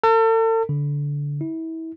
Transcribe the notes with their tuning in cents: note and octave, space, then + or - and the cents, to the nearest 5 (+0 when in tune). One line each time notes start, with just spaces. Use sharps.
A4 +40
D3 -20
E4 -30